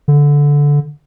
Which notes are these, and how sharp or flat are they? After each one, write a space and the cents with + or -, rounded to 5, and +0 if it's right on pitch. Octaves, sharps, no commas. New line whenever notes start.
D3 -15